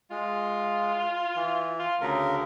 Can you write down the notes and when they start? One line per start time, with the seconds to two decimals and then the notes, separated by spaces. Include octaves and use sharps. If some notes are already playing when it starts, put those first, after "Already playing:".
0.11 G#3 F4
1.36 E3
1.79 F4
2.01 D2 C#3 A#4